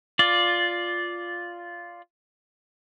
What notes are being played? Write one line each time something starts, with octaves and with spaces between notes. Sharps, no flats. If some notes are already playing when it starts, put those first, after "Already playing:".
F4 D5